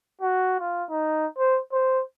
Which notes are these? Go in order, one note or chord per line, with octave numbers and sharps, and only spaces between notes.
F#4
F4
D#4
C5
C5